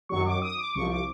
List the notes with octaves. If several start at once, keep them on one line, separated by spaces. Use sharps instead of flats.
F#2 D#3 F#3 C#6
D6
D#6
D6
C2 C3 F3 C#6
D6